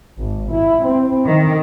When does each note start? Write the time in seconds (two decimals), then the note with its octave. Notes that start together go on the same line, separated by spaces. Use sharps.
0.18 G#1
0.50 E4
0.84 C4
1.25 D#3